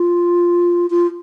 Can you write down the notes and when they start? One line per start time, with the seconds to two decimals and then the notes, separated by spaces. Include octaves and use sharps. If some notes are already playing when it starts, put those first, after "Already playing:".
Already playing: F4
0.90 F4